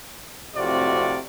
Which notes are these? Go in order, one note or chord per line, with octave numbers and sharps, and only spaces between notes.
F2 A2 C3 F4 F#4 D5